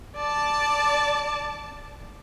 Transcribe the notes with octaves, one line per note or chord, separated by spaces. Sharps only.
D5 A5